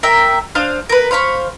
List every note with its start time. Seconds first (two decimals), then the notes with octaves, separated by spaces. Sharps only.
0.03 A#4 E5 G5
0.55 D4 C5 F5 D#6
0.89 A#4 B4
1.11 C5 F5 B5 C#6